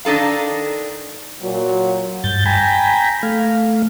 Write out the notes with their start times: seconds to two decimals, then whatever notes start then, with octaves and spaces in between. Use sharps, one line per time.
0.05 D#3 D4 D#4 A4 F5
1.42 A#2 F#3
2.24 G2 G6 A6
2.46 G5 G#5 A#5 B5
3.23 A3 F5